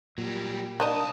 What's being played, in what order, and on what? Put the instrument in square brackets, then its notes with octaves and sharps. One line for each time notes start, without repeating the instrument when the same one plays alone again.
[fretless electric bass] A#2 [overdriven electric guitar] F#3 G3
[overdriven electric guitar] C2 A5 [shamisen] A#3 D4 D#4 [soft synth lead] D#6